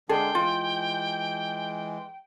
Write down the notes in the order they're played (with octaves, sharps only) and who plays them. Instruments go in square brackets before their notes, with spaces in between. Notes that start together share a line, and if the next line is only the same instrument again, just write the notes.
[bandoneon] D3 G#3 D4 [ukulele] G#4 A4 [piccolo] G5
[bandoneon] E3 G#3 [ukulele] F4